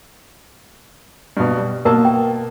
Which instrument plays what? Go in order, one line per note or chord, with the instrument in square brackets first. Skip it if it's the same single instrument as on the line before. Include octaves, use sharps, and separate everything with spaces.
[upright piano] G2 B2
G3
[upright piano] B2 A#3 A5 [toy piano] A#4
[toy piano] G5